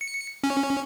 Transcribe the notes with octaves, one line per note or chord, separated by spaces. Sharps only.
C#7
C#4